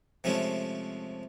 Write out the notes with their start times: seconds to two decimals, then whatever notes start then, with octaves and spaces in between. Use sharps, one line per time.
0.24 C3 F3 G#3 A3 C#4